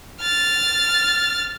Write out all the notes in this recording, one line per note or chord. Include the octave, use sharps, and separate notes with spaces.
F6 A6